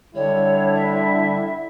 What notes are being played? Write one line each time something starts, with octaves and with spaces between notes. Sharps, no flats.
D3 G3 E4 C#5
E5